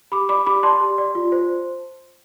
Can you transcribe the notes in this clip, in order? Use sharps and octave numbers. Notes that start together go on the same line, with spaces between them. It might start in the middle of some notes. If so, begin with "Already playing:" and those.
G4 B5 D6
D5 B5 D6
G4 B5 D6
D5 A5 C6
G4
D5
F4
C5